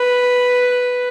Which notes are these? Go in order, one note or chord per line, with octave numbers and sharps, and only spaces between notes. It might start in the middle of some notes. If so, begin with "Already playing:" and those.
Already playing: B4